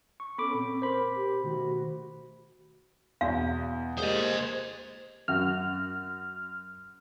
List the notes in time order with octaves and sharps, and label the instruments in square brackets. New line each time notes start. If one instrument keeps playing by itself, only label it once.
[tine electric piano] C#6
[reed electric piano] B3 C#4 [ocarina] A4 [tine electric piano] B5 D6
[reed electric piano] A#2 [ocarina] C4
[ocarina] A#4 [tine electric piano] C5 B5
[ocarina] G4
[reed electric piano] B2 D#3 A3 [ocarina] F#4
[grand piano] E2 [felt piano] B2 [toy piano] F5
[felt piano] G#3 A#3 G4 [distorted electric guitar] C5 D#5 [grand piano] D#6
[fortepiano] F#2 F#4 [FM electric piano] F6